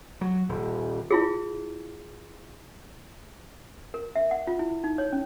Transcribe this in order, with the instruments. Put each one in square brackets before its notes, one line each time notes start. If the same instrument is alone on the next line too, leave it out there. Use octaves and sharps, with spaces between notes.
[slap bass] F#3
D#1
[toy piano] E4 F4 G#4
A#4
E5
F#5
F4
E4
D#4
C#5
C#4